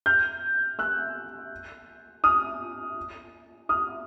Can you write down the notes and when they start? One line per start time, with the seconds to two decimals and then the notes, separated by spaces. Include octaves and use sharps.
0.06 F6 G6
0.79 E6 F#6
2.24 D#6 F6
3.69 D#6 F6